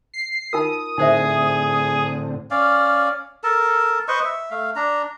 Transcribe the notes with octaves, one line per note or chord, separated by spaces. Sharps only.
C7
D#4 F4 A#4 D#6
A2 D3 C4 D#4 G#4 C5 E5
C#4 D5 F5
A4 A#4 A5
B4 C5 D#5 C#6
E5
A3 F5
D4 A#5